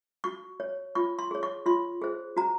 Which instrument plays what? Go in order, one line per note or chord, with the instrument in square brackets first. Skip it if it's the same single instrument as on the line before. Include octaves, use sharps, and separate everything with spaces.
[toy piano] F#4 C#6
C#5
F4 C#6
C6
G#4 C#5
C#6
F4 C6
G#4 C5
F#4 A#5